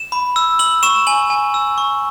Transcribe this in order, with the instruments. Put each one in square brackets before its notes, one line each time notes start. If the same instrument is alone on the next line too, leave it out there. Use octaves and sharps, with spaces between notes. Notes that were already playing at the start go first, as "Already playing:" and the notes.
Already playing: [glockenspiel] E7
B5
E6
E6 F#7
C#6 E7
G#5 F#7
G#5
E6
C#6